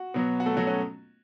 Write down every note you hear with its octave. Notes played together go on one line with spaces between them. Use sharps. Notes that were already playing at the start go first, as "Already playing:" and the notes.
Already playing: F#4
B2 F#3 B3
F#4
A3 A4
F#3 F#4
C#4